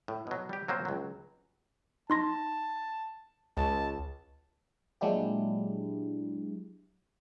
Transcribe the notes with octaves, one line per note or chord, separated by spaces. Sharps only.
A2
B2 F#3
G3 G4
F#3 A#3 C4 C5
C#2 F#3
D#4 A5 C6 A#6
C#2 A5
A#2 F#3 G#3 D4 E4 G4